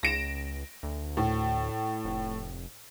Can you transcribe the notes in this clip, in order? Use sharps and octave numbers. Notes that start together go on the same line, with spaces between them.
C#2 A#6 D7 E7
D2
A2
F1